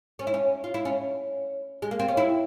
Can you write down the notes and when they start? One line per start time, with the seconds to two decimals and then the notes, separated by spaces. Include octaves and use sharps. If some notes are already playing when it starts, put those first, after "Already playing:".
0.19 C#4
0.27 E4
0.34 C#4
0.64 F4
0.74 E4
0.85 C#4
1.82 G#3
1.91 A#3
1.99 C4
2.08 C#4
2.17 E4